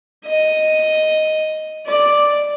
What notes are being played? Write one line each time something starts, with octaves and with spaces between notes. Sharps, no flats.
D#5
D5